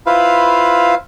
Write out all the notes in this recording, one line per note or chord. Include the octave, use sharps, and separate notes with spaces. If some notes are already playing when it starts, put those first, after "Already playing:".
E4 F4 B4 C5 F5